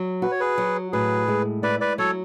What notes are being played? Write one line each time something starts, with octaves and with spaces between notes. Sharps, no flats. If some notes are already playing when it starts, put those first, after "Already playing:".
Already playing: F#3
F#4 B4
C#5
G#4 B4
F#3
A2 G#4 B4
G#3
E4 B4 D5
B4 D5
F#3 A4 C#5